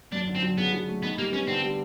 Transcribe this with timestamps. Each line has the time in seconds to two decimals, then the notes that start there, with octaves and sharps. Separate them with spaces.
0.12 F#2 D4
0.28 D3
0.35 C4
0.43 F#3
0.57 C#3 B3
0.73 F#3
0.88 A3
1.03 D#3 B3
1.18 G3 A#3
1.32 B3 C#4
1.47 D3 C4
1.63 G3